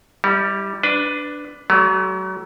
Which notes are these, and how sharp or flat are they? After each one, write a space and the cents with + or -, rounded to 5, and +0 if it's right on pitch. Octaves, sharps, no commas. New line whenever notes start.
G3 +0 E4 -40
D4 +0 B4 +15
F#3 +35 A3 -35